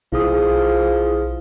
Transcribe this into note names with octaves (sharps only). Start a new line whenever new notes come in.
B1 F3 E4 G#4 D#6